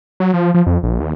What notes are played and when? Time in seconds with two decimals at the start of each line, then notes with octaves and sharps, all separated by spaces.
0.20 F#3
0.34 F3
0.54 F3
0.67 F2
0.83 A#1
1.00 D#2